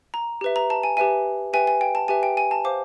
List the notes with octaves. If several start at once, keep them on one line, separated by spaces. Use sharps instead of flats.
A#5
G4 B4 E5
A#5
A5
G#5
G4 B4 E5 G#5
G4 B4 E5 G5 G#5
G#5
G5
A5
G4 B4 E5 G5 G#5
G5
G#5
A5
C5 F5 D6